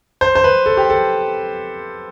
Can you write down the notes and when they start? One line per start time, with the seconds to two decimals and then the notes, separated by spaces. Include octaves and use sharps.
0.21 C5
0.35 C5
0.44 B4
0.66 A4
0.77 G4
0.90 A4